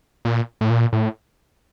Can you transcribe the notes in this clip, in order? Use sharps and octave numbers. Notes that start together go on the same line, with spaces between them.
A#2
A2
A#2
A2